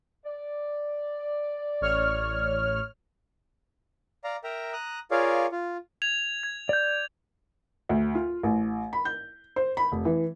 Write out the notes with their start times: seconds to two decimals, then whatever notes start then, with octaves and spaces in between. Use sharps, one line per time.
0.25 D5
1.81 A1 C#5 F6
4.24 D5 F5 A#5
4.44 A#4 E5 G5 A#5
4.73 A#5 D#6 F#6
5.11 F4 G#4 A#4 C#5 D5 F5
5.52 F4
6.02 G#6 F7
6.43 G#6
6.69 D5 G6
7.89 D2
8.15 F4
8.43 A1
8.93 B5
9.05 G6
9.56 C5
9.77 B5
9.92 F1
10.05 E3